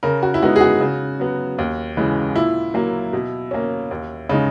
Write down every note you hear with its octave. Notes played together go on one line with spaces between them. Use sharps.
C#3 A#4
F#4
E4
G#3 B3 D#4 F#4
G#4
F#4
C#3
F#3 B3
D#2
C#3 E3 G#3
A#2 E4
F#3 A#3
B2
A#3 C#4
D#2
C#3 G#3 D#4